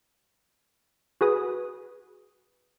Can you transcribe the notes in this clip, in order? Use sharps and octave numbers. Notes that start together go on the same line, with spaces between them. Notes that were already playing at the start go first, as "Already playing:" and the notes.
F#4 G#4 B4 D#6